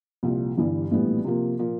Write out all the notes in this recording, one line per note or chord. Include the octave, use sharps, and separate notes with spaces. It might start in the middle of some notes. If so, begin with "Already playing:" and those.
C2 A#2 F3
G1 G2 E3 G3
A#1 A2 E3 G3 B3
C3 F3 A#3
A#2 F3 A#3